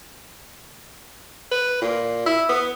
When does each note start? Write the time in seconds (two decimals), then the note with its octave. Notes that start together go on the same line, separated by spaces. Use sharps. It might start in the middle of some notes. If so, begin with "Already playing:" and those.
1.51 B4
1.82 A#2
2.26 E4
2.49 B3